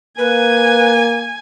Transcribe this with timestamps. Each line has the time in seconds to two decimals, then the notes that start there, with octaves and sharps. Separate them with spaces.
0.18 A#3 B4 G#5